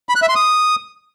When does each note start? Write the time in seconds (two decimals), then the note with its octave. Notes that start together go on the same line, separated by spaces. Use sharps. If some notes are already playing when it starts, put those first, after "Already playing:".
0.09 B5
0.16 F#6
0.22 E5
0.29 C6
0.35 D#6